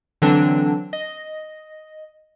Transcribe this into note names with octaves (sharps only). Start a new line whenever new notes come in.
D3 E3 F#3 C4 D4
D#5